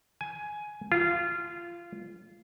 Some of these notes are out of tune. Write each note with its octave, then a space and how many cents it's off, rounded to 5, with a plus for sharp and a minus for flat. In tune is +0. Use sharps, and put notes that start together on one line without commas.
G#5 +15
F4 -20